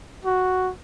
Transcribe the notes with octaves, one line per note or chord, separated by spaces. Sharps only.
F#4